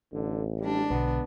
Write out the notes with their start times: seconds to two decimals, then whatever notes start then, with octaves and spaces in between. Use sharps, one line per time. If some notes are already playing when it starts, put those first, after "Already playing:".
0.13 A1 D3
0.60 G3 G#3 D4
0.90 B1 B2 D3 B3